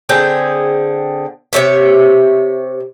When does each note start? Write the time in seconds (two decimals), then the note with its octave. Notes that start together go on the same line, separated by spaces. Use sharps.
0.09 D3 C4 G#4 G5
1.53 C3 G3 C#5 E5